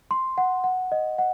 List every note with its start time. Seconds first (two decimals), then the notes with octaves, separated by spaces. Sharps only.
0.11 C6
0.38 F#5
0.64 F#5
0.92 D#5
1.18 F#5